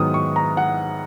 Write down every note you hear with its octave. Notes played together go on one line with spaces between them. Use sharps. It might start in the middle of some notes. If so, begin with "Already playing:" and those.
Already playing: G#2 D#3 F#3 B3 D#6
C#6
A#5
F#5